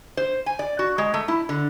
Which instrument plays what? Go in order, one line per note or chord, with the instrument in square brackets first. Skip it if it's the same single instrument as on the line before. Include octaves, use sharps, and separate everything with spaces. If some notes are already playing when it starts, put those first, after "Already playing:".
[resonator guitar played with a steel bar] C5
G#5
D5
F#4
G#3
A3
E4
D3